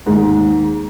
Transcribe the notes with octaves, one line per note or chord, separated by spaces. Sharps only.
D#2 G#2